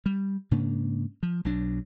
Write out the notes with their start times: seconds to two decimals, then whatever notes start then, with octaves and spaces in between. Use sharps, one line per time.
0.06 G3
0.51 G#2 C#3 A#3 D4
1.23 F3
1.45 B1 B2 F#3 D4